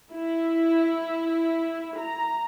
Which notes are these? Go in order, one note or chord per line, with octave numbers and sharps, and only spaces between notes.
E4
A#5